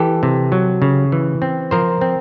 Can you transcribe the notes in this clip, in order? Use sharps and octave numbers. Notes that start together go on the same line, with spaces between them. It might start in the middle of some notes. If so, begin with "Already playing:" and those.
Already playing: E3 G4 A4
C3
F#3
C#3
E3
C4
F3 A#4 C5
C4